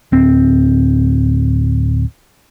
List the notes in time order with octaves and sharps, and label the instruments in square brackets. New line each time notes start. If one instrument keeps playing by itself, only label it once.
[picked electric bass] D1 C4